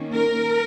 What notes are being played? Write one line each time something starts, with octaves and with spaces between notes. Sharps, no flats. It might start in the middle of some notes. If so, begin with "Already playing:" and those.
Already playing: D#3 A#3 C#4
A#4